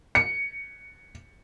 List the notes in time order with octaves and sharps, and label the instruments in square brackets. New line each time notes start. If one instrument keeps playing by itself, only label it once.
[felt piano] C#7